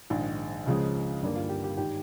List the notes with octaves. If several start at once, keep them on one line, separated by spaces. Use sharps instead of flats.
A#1 G#2 D#3
C#2 C#3 F3 G#3
G1 G2 D#3 G3 A#3
F4
G4
G4
G#2 D#3 G4